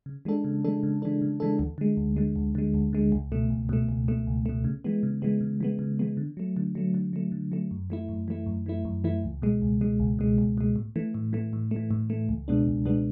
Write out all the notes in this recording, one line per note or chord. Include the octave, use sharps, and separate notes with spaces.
C#3
E3 G#3 D4 A4
C#3
E3 G#3 D4 A4
C#3
E3 G#3 D4 A4
C#3
E3 G#3 D4 A4
D2
D3 G#3
D2
D3 G#3
D2
D3 G#3
D2
D3 G#3
C#2
B2 A3
C#2
B2 A3
C#2
B2 A3
C#2
B2 A3
C#3
E3 G#3 B3
C#3
E3 G#3 B3
C#3
E3 G#3 B3
C#3
E3 G#3 B3
D3
F#3 A3
D3
F#3 A3
D3
F#3 A3
D3
F#3 A3
F#2
E3 A3 E4
F#2
E3 A3 E4
F#2
E3 A3 E4
F#2
E3 A3 E4
C#2
B2 G#3
C#2
B2 G#3
C#2
B2 G#3
C#2
B2 G#3
A2
E3 A3
A2
E3 A3
A2
E3 A3
A2
E3 A3
C#2
B2 G#3 B3 D4
C#2
B2 G#3 B3 D4